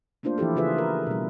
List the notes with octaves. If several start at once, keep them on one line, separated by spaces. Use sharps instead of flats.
A3 A#3 D4 F4 C5
E3 F3 E4 G4 A4
C#3 E3 F4 G#4 B4 E5
A#4
B2 G3